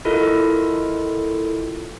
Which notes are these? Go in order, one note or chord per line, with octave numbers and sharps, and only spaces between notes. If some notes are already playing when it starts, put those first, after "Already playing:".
E4 F4 A4 A#4 D#5